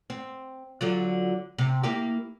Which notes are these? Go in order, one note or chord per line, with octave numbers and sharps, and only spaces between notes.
C4
D3 F#3 F4
C3
A#3 E4 G4